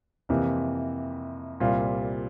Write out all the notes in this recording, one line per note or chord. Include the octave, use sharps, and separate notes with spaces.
F2 C3 E3 A#3 E4
C2 A#2 G3 C4 F4